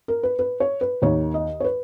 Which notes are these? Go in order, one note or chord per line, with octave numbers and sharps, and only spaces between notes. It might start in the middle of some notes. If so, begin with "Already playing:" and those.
A#4
B4
B4
C#5
B4
D#2 D#3 C#5
D#5
C#5
B4